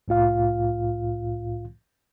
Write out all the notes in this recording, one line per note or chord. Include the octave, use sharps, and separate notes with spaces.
C2 A2 F4 F5